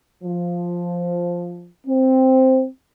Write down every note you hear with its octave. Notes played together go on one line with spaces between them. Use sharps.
F3
C4